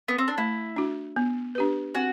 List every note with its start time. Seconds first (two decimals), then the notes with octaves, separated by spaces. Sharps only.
0.08 B3
0.18 C4
0.28 D4
0.38 A3 E4
0.76 D4 F#4
1.16 B3
1.55 D4 G4 B4
1.95 C4 F#4